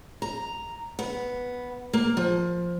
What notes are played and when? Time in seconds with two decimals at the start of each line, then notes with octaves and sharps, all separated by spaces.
0.22 A#5
0.99 B3
1.93 A#3
2.17 F3